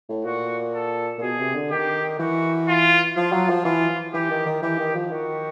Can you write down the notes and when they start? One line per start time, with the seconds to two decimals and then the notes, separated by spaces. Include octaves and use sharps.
0.09 A2
0.25 A#2 F#4
0.74 A4
1.18 A#2
1.22 B2 G#4
1.39 C3
1.55 D3
1.70 D#3 G4
2.19 E3 F#4
2.68 F4
3.16 F3 F4
3.32 F#3
3.49 F3
3.65 E3 F4
4.13 E3 G4
4.30 D#3
4.46 D#3
4.62 E3 G4
4.79 D#3
4.94 F3
5.11 D#3 F#4